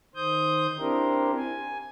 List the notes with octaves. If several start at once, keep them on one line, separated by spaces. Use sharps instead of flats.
D#3 C5 D#6 G6
C4 D4 E4 G4 A#4 C5
G#5